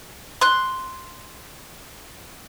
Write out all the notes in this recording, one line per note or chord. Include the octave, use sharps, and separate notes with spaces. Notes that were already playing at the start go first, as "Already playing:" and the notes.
C6 F#6